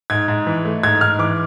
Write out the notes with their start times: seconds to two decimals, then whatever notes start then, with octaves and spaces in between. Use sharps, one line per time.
0.10 G#2 G#6
0.28 G#2
0.47 E3
0.65 A3
0.83 G#2 G#6
1.01 G#2 F6
1.19 E3 D6